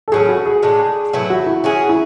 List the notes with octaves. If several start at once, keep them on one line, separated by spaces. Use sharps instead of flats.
A4
A2 F#3 C#4 G#4
F#4
G#4
A2 G#3 D4
A2 F#3 B3 E4
F#4
E4
F#3 C#4 G#4
E4